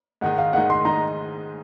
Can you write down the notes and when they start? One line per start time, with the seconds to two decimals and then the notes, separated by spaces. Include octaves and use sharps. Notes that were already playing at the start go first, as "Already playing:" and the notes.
0.21 G#2 D#3 G#3 D#4 F#5
0.38 F5
0.53 G#2 D#3 G#3 D#4 F#5
0.70 C6
0.85 G#2 D#3 G#3 D#4 A#5